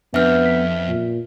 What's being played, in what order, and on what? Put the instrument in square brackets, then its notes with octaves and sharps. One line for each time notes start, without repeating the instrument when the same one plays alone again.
[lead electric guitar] F2 [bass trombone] B3 [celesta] D4 B4 G6 [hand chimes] E5 F6
[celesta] B6
[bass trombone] A#2